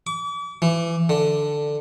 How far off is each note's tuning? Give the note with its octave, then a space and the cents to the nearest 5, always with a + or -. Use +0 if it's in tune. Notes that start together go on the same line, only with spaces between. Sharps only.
D6 -40
E3 +30
D3 +5